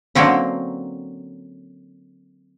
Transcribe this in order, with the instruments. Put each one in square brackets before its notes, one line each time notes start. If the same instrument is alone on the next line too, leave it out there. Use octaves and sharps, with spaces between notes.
[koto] D3 F#3 A#3 C4 C#4